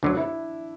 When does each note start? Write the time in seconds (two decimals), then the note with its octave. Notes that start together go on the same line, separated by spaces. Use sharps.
0.03 D2 D3 F#3 D4
0.17 E4